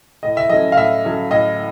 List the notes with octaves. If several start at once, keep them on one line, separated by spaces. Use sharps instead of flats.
A2 D#5
E5
F#3 A3 C#4 D#5
F5
A2 E5
F#3 A3 C#4
A2 D#5